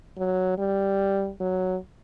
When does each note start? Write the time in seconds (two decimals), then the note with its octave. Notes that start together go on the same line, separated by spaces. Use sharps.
0.18 F#3
0.58 G3
1.40 F#3